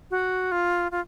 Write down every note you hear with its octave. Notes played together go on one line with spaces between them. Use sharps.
F#4
F4
F4